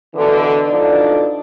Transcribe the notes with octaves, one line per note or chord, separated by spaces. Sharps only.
B2 D3 E3
B2 F3 D4 D#4 A4 D5